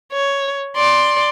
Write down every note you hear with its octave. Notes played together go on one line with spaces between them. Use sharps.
C#5
D5 C6